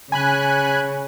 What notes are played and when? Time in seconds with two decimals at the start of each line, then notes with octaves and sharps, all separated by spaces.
0.12 C#3 G#5 B5 F#6